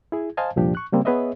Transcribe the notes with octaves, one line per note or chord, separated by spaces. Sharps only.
E4 G#4
C5 D#5 F5 G#5 A5
C2 F2 A#2 F3 D4 G4
C#6 F#6
C#3 G3 A#3 C4
B3 G#4 B4 C#5 D#5 E5